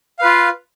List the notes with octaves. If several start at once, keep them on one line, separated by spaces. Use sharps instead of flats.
F4 B4 F5